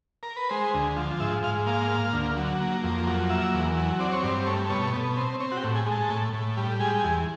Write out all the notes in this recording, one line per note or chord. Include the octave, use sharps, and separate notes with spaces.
A#4
B4
G#3 C5
D2
F3
G#2 E5
G#2 F5
A#3 F5
A#3
D2
F#3
A#3
F2
F#3
A#3 E5
E2
F#3
C4 D5
C#5
G2 D5
A3 C#5
B2 C#5
B2
C4
C4 C#5
F#4
G4
A2
G#4
G#3
A4
A2
A2
G3
G#3 G#4
G4
E2 G#4